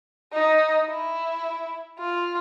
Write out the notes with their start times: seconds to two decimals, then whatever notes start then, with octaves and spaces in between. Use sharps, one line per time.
0.33 D#4
0.89 E4
1.99 F4